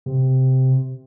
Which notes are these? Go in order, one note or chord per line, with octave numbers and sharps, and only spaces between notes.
C3